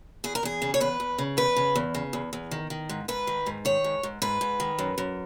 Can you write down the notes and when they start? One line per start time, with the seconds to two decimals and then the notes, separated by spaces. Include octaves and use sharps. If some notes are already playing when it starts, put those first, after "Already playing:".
0.24 E2 G#4
0.35 A#4
0.43 E2 G#4
0.62 C#3
0.74 C#5
0.80 E2 B4
1.00 E2
1.18 C#3
1.37 E2 B4
1.56 C#3
1.75 E2
1.95 C#3
2.13 E2
2.33 E2
2.51 D#3
2.70 D#3
2.89 G#2
3.08 G#2 B4
3.27 D#3
3.46 G#2
3.65 D#3 C#5
3.84 G#2
4.03 G#2
4.22 G#2 B4
4.41 G#2
4.60 D#3
4.79 F#2
4.98 F#2